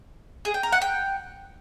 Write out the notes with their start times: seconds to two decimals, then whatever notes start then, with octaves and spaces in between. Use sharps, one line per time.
0.45 G#4
0.54 G5
0.63 A#4
0.72 F#5
0.82 G5